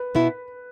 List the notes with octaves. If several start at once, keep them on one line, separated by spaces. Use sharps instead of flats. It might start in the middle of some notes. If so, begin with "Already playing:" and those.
Already playing: B4
B2 B3 E4